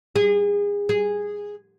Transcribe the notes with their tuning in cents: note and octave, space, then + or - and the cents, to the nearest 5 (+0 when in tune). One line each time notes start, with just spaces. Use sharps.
G#4 -30
G#4 -10